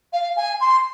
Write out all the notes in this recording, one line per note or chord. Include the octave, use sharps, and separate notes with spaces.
F5
G#5
C6